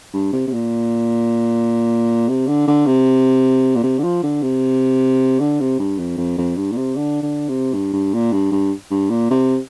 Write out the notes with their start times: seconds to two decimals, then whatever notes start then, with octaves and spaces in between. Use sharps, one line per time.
0.14 G2
0.33 C3
0.47 C3
0.52 A#2
2.28 C3
2.47 D3
2.68 D3
2.86 C3
3.76 A#2
3.83 C3
3.99 D3
4.04 F3
4.23 D3
4.42 C3
5.39 D3
5.60 C3
5.79 G2
5.98 F2
6.17 F2
6.38 F2
6.56 G2
6.72 A#2
6.76 C3
6.96 D3
7.23 D3
7.48 C3
7.74 G2
7.93 G2
8.14 A#2
8.33 G2
8.52 G2
8.91 G2
9.10 A#2
9.30 C3